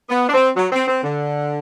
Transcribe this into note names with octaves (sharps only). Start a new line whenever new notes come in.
B3
D4
C4
F#3
C4
C4
D3